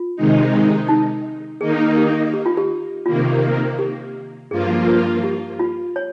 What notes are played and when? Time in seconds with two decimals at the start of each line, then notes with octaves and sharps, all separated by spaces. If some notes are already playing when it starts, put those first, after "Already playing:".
Already playing: F4
0.16 C3 D#3 G#3 D#4
0.88 D#4
1.60 D#3 A#3 D#4 G#4
1.98 G4
2.34 G4
2.46 F4
2.57 G4
3.06 C3 D#3 A#3 F4
3.79 G4
4.51 G2 F3 A#3 F4 G#4
4.87 A#4
5.24 G4
5.59 F4
5.96 C#5